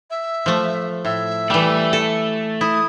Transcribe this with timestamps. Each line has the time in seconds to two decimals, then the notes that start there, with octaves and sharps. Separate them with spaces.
0.10 E5
0.46 F3 A3
1.05 A2 E5
1.50 E3 G3 A3
1.93 A4
2.61 E4 D#6